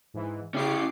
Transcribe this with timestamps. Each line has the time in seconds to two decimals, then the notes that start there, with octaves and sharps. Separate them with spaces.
0.14 G#2 E3
0.54 C#3 C#4 E4 G4 D6 C7